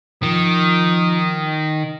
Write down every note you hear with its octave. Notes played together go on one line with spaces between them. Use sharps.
D#3 F3 D#6